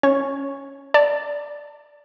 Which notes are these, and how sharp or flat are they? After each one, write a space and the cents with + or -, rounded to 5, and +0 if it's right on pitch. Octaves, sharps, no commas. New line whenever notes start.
C#4 +0 C#5 -10 C#6 +0
D5 -5 A5 +25